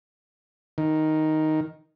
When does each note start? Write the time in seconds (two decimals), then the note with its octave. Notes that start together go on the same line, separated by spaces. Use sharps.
0.78 D#3